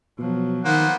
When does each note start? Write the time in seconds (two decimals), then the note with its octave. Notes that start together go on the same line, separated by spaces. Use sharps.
0.18 B2 F3 F#3
0.65 D#3 A#3 B3 C5 F#5